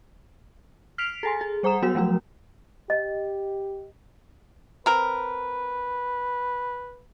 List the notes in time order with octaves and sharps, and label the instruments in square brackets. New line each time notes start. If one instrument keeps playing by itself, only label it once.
[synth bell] F6 B6 C7 D7 F7
G#4 A4 G#5 C6
G#4
G3 C5 F#5 A#5 D#6 E7
F#3 B3 F#4 A#4 E6 E7
F3 F#3 A3 F#4
[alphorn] G4 [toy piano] D#5
[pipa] C4 A#4 [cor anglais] B4